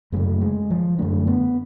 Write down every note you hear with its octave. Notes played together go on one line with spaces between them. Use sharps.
F#2 C#3 A3
G#3
F3
F#2 D3 A3
B3